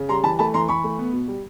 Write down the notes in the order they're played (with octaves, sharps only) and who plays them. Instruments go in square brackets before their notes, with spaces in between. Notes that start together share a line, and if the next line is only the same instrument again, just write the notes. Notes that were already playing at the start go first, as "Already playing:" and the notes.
Already playing: [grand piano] C#3
G3 A#5 C6
E3 A5 B5
A3 A5 B5
E3 A#5 C6
E3 B5 C#6
A3
B3
B2
G3